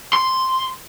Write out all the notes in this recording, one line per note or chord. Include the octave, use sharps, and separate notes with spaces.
C6